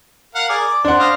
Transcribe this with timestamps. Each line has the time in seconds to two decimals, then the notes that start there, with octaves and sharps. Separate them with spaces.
0.35 A#4 F5 F#5
0.49 G#4 A#4 D5
0.67 D5
0.85 D4 C5 F#5
0.99 C5 D#5 F5